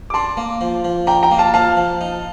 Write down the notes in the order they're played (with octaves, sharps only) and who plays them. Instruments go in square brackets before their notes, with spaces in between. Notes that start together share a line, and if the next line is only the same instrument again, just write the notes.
[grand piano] D6
[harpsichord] D4 [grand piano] A5 C6
[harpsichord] A#3
F3
F3
[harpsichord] D4 [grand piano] G5 A#5
[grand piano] G5 A#5
[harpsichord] A#3
[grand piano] F5 A5
[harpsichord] F3 [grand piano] F5 A5
[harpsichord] F3
D#4